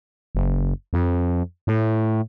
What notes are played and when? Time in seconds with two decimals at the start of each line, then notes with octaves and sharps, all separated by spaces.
0.35 F#1
0.93 F2
1.67 A2